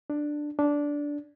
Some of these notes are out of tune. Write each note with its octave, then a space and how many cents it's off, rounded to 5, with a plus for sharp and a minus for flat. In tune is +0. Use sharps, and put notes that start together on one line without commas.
D4 +10
D4 -10